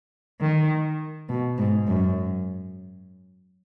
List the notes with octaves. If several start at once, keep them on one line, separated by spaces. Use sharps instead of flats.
D#3
B2
G#2
F#2